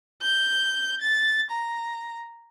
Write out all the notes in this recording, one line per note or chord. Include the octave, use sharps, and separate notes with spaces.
G6
A6
A#5